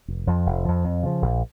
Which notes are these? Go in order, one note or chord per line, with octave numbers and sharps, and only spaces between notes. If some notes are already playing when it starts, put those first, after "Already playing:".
F1
F2 F3
F1
F2 F3
F2
C#3 F3
A#1